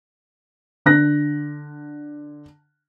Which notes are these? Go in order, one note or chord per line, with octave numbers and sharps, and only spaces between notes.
D3 F#6 A#6